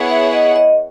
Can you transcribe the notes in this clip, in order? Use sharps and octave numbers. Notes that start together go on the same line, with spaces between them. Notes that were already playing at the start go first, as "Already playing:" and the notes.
Already playing: B3 E4 G#4 C#5 F#5
E5
D#5
D#5